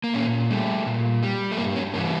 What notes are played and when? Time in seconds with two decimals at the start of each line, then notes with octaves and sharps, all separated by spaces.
0.04 A#3
0.14 A#2 C#4
0.50 G3 A3
0.86 A#2
1.23 G3
1.52 A3
1.58 G2 A#3
1.76 C#4
1.94 E3 G3 A#3